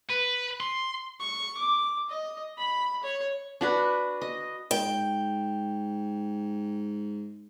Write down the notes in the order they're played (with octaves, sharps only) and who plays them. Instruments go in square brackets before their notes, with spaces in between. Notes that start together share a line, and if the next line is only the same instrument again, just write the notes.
[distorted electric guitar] B4
C6
[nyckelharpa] C#6
D6
D#5
B5
C#5
[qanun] D4 F#4 B4
D#5
[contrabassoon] G#2 [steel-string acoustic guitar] G5